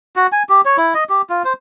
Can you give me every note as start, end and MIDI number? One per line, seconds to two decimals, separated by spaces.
0.16 0.27 66
0.32 0.43 80
0.49 0.61 67
0.65 0.77 73
0.77 0.94 64
0.94 1.04 75
1.09 1.22 67
1.30 1.43 65
1.45 1.53 72